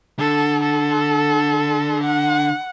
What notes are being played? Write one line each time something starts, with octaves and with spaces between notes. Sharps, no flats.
D3 A4
A4
F#5